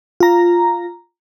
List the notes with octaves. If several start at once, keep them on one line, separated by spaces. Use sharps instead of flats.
F4 A#5